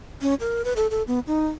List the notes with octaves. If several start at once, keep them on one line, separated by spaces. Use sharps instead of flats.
C#4
A#4
B4
A4
A4
B3
D#4